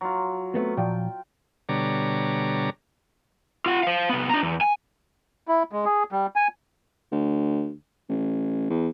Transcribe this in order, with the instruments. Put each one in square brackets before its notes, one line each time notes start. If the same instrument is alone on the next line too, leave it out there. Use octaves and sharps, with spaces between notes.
[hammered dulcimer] F#3 F4
[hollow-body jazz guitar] A3 B3 C4
[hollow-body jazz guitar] A#2 F3 [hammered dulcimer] G5
[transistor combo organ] B2 D3 G3 C#5 A#5 D6
[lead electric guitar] F4 F#5
C5 F5
C2 B3
D4 A#5
E2
G#5
[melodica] E4
G#3
G#4
G3
G#5
[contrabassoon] D2
A1
E2